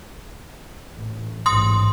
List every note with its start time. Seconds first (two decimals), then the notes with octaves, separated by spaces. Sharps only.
0.92 A1
1.46 A1 G#2 C6 D#6